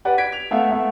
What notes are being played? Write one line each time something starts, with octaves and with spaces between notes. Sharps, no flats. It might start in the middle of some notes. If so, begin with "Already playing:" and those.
G4 B4 D5 F#5
G#6 B6 D7
F7
A3 B3 E5 F5
A3 B3 E5